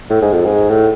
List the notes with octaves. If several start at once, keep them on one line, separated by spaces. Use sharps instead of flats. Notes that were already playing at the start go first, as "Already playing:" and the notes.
A2
G#2
F2
G#2
A2